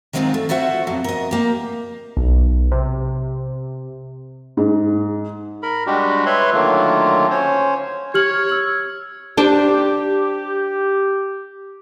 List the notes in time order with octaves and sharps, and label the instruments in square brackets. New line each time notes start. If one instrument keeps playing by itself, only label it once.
[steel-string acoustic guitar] D#3 F#3 G#3 C4 D#4 F4
A3
F4 F#4 C5 E5 F#5
F2 B2 F#3
A#4 D#5
A#3 G4
[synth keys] B1
C3
[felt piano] G#2
[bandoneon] A#4 B5
G3 G#3 D4 F#4 G4
B4 C#5 E5 B5 C6
D3 D#3 F#3 A3 A#3 F4
C#4 C5 C#5
[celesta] G4 F6 F#7 [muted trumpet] C#5
[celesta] E6 F6 F#7
[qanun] D4 C5 G5 [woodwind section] G4